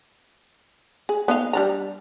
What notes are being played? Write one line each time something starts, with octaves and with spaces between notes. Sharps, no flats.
G#4
B3 D#4 F5
G3 D4 A#5